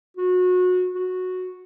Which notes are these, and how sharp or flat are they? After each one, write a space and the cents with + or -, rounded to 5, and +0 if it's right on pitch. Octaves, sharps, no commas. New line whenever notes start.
F#4 -25
F#4 -10